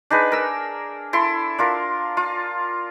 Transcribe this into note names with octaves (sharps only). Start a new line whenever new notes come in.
D4 D#4 G#4 B4
A#4 E6
E4 A4 C6
D4 F4 A#4
F4